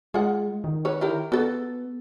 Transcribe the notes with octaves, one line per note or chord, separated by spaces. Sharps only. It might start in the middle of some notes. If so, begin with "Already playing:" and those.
G#3 F4 F#5
D#3
B4 C#5
E4 G4 A#4
B3 F#4 A4